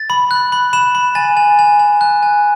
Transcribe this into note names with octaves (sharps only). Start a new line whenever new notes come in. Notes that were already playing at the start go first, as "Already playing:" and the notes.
Already playing: A6
B5
F#6
B5
B5 E7
B5
G#5 A6
G#5
G#5
G#5
F#6
G#5